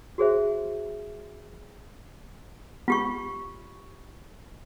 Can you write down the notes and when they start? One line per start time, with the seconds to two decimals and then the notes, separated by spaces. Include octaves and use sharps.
0.18 F#4 G#4 C5 E5
2.88 B3 F4 G4 C#6